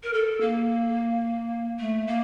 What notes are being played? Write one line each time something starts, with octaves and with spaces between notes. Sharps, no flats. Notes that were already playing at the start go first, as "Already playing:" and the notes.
A#4
A4
A#3
A3
A#3